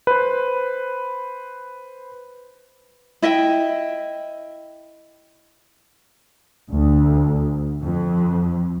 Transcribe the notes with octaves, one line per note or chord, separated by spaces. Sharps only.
B4 C5
E4 D#5 E5 G5
D2
F2